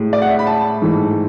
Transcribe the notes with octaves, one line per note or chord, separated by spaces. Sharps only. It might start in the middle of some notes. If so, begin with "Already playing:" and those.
Already playing: A2 G#3
D5
F#5
E5
B5
A5
G#2 E3 A3